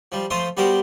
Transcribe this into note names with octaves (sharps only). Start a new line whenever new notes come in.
F3 G3
F3 A3 F4 C5 E5 D#6
G3 B3 F#4 G4 A#4 C5